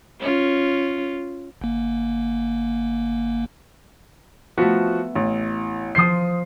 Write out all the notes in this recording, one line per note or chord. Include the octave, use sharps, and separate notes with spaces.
C#4 F4
G1 A#3
F3 A3 B3 F#4
A1
F3 C5 D#6 C7